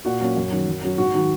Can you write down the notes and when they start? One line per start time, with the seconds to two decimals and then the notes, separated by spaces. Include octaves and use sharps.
0.05 A#2 F#4 F#5
0.21 F#3 A#3 C#4
0.37 F#2
0.51 D#3 F#3 C#4
0.68 F#2
0.83 F#3 C#4
0.98 G#2 F#4
1.14 D#3 F#3